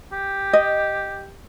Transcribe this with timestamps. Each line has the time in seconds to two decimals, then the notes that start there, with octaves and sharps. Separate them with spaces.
0.13 G4
0.53 D#5